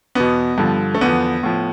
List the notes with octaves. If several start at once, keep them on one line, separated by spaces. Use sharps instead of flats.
E2 B2 B3
G2 D3 F3
A3
E2 D3 F3 B3
A2 F3